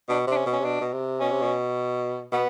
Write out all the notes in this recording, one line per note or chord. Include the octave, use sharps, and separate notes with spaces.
B2 D4
C3 D4
C#4
B2
C#4
C3
B2 D4
B2
C3
B2 C#4
C3
B2
B2 B3